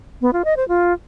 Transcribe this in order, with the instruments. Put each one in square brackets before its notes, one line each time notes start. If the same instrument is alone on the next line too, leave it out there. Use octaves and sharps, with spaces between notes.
[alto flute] B3
F4
D#5
C5
F4